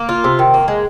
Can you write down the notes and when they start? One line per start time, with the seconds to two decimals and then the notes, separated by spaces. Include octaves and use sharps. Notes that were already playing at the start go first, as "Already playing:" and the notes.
Already playing: A#3
0.09 F4
0.24 C3
0.39 D#3
0.54 A#3
0.68 G#3